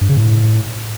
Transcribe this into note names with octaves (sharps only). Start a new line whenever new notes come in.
G2
C#3
A2